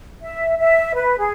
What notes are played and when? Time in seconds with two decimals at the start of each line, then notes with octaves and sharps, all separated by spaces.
0.22 E5
0.58 E5
0.95 B4
1.19 G#4